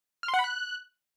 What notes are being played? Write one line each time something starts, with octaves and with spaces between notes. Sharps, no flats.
F6
C6
F#5
B5
F#6